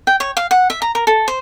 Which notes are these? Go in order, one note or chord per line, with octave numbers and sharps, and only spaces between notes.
G5
C#5
F5
F#5
E5
A#5
A#4
A4
C5